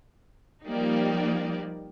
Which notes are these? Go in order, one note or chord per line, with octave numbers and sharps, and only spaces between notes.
F3 G3 A#3 D#4 G4 D5